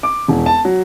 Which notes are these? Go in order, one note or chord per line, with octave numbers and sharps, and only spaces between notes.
D6
E1
A5
F#3